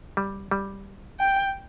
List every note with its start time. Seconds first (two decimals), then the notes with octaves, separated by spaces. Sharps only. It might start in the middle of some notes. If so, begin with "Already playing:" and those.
0.17 G3
0.51 G3
1.20 G5